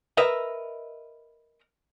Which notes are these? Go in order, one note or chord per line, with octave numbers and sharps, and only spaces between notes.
A#4 B4 D#5 E5